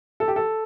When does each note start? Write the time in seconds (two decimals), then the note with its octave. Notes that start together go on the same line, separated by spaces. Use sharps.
0.20 A4
0.28 G4
0.36 A4